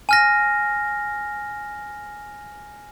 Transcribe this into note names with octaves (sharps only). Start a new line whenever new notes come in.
G#5 F6 A#6